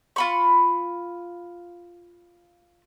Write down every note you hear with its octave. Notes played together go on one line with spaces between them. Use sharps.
F4 B5 C#6